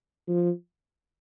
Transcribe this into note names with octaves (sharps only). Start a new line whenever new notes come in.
F3